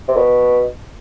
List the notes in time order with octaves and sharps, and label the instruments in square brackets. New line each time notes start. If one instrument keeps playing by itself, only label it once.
[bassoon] C3
B2